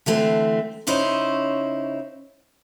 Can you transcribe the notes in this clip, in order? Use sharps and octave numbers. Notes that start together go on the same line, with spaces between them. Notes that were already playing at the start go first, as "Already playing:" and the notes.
D3 E3 A3 C4
C#3 C#4 D#4 E4 C5 C#5